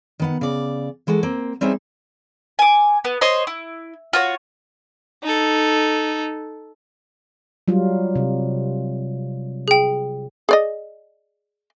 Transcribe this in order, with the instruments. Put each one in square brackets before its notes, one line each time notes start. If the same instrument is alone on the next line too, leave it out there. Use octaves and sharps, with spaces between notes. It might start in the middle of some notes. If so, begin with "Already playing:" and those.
[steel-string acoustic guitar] D#3 B3 F#5
C#3 D5
E3 G#3 F#4 A4
A#3 C4
G3 C4 C#4 D#4 G#4 E5
[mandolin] G#5 D6
B3
C5 C#5 D#5 C6
E4
F4 F#4 C#5
[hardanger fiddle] D#4 A4
[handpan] F#3 G3 F4
C3
[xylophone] G#4 G5
[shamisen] G#4 D5 D#5